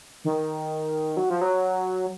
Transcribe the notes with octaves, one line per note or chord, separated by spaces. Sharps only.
D#3
F#3
F3
F#3